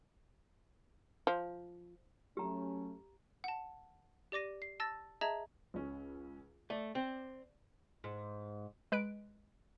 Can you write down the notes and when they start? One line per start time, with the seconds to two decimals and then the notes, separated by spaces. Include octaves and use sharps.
1.27 F3
2.37 F#3 A3 C#4 G4 A#5
3.44 F#5 A5
4.32 G4 D5 D6 A#6 D#7
4.62 C7
4.80 A5 E6 A6 A#6
5.21 G#4 D#5 E5 A5 A#5 G#6
5.74 C#2 C#4
6.70 A3 D5
6.95 C4
8.04 G#2
8.92 G#3 B4 F#6 D7